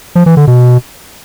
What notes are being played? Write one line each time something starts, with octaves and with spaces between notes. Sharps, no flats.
F3
E3
D3
B2